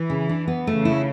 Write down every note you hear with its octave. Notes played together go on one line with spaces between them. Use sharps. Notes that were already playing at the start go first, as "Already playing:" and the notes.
Already playing: E3
C#3
D4
B3
C#3 A3
E4